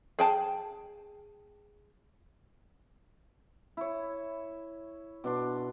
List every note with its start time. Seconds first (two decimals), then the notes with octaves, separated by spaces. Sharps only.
0.19 G#4 G5 A5
3.77 E4 C#5
5.24 B2 D4 C6